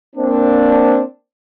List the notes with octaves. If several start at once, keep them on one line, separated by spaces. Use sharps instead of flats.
A#3 C4 D4